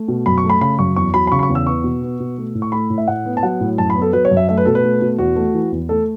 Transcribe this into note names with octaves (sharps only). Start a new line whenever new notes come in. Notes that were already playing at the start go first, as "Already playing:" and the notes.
Already playing: A3
B2
F#2 B5
C#6
A3
B5
C#3 B5
F#2 C#6
E2 C#6
F#3 B5
B5
C#3 C#6
B5
C#6
E2
E6
B3 C#6
B2
B3
B2
A3
A2
C#6
A3 B5
A2
E5
A2 F#5
B3
A5
F#3 F#5
A2
F#2 A5
B5
B3
A4
F#3 B4
C#5
F#2
E5
A3 E5
B4
B2 A4
B4
A3
B2
E2 F#4
A3
E3
E2
A3 A4